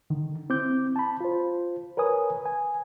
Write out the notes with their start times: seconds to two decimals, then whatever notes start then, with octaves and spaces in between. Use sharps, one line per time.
0.10 D3 D#3
0.50 C4 E4 D6 G6
0.96 A5 B5
1.21 F4 C5
1.97 A#4 B4 C#5 G#5 D#6
2.46 G#5